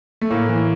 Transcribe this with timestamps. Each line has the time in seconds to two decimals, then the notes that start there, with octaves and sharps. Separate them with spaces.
0.21 A3
0.30 A2 A#3
0.49 E3